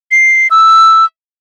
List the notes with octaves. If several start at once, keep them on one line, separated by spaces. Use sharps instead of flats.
C7
E6